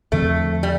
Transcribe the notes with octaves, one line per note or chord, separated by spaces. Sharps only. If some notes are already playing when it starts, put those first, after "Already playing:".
E2 D3 F3 A3 C4
G3